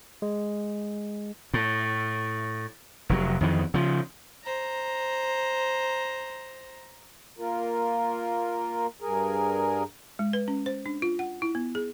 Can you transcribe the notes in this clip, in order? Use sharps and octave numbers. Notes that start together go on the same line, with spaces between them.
G#3
A2
F1 A#2 F#3
F2 D#3 E3
C#3 F3
C5 A#5
A#3 F4 A#4
G2 G#4 A#4
G#3
B4
C#4
C5
D4
F4
F#5
E4
B3
G#4